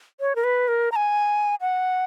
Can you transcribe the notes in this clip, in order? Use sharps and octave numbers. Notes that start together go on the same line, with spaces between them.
C#5
A#4
B4
A#4
A#5
G#5
F#5